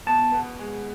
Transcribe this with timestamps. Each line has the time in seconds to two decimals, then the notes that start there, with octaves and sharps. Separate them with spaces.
0.06 B2 A5
0.32 B3
0.59 G#3